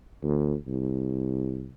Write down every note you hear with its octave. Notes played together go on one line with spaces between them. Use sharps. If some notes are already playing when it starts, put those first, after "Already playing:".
D2
C2